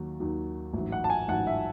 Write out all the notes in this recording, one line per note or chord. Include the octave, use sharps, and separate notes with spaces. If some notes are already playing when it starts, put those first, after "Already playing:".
Already playing: D#2 D#3 F#3
D#2 D#3 F#3
A1 G#2 F#3
F#5
A5
G#5
A1 G#2 F#3 F#5
E5